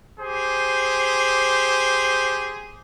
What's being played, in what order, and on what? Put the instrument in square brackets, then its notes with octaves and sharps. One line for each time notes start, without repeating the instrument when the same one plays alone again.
[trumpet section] G4 G#4 C5